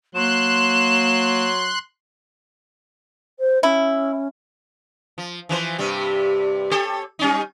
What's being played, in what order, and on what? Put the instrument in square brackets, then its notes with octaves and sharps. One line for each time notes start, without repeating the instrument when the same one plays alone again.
[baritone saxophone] F#3 [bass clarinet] A#3 [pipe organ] C6 F#6 [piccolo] E7
[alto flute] C5
[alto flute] C#4 [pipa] E4
[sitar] F3
E3 F3 C5
G2 C3 G3
G4 A4 C#5
G3 C#4 D#4